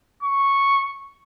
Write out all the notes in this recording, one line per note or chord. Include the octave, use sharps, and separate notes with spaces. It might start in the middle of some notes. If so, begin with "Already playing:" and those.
C#6